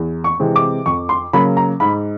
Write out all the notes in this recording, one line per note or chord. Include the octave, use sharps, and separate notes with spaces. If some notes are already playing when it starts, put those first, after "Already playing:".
Already playing: E2
C#6
C3 E3 G#3 C4
D6
F2 C#6
C6
C#3 F#3 A#3 B5
A#5
G#2 B5